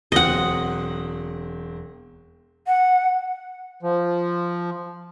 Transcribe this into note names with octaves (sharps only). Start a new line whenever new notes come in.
E1 F#3 C4 D#5 F#5
F#5
F3